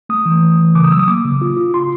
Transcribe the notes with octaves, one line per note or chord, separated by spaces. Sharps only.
A3 D#6
E3
A3
E3
C#3 D6
D#6
F#3 E6
D#6
A#3 D6
C#3
F4
F4
F4 C6